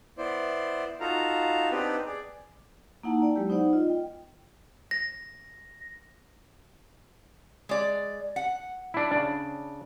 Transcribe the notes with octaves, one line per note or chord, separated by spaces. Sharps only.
B3 E4 C5 D5
D#4 F4 F#4 A4 F5 A#5
B3 C4 D4 D#4 G4 B4
G#4 D5
A#3 D#4 E4 F#5 A5 A#5
D5 G5
F#3 G#3 E4 G4
B3 D#4 C5 D5 F#5
F4 D#5
G5
A#6
G#3 D5
F#5
D4 E4
C#3 D4